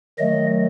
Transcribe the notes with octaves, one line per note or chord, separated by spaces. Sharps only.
D#3 F#3 A3 D#5